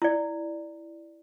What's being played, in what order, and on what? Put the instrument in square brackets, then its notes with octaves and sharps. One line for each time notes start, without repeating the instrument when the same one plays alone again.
[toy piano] E4 D5